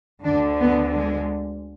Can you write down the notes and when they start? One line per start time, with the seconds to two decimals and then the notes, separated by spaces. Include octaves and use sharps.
0.24 D2 D3 D4
0.61 B3
0.95 G#3